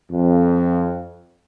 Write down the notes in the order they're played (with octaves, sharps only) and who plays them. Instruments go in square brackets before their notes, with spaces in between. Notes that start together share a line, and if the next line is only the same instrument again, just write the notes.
[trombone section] F2